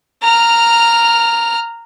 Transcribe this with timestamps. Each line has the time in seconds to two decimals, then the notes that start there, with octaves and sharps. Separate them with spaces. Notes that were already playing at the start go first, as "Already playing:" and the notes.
0.22 A#5 F6